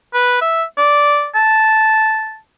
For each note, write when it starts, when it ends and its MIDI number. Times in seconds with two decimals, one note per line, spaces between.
0.14 0.41 71
0.41 0.63 76
0.77 1.27 74
1.35 2.37 81